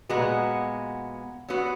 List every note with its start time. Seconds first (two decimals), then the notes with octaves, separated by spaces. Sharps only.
0.09 A#2 G#3 B3 F#4
1.48 F#3 B3 F#4